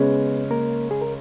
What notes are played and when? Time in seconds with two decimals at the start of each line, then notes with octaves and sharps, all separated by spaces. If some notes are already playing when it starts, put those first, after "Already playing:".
Already playing: C#3 G#3 B3 C#4 B4
0.51 A#3 A#4
0.91 G#4
1.02 A#4